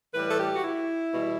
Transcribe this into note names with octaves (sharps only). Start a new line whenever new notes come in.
A2 E3 G3 B4
A4
G4
F#4
E4
E2 B2 G3